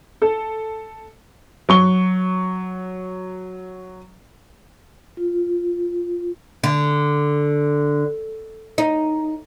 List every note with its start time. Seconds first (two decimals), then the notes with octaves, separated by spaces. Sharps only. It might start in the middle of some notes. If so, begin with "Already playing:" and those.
0.22 A4
1.69 F#3 C#6 G7
5.17 F4
6.64 D3
8.78 D#4